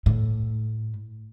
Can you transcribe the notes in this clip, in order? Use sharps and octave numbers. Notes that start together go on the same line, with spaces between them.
A2